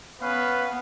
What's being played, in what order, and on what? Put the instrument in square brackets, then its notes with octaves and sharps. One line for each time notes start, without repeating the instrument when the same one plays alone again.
[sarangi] B3 [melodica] C#4 F5 [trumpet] B4